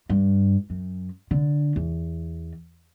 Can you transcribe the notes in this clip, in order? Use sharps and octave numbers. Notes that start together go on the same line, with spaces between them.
G2
F#2
D3
E2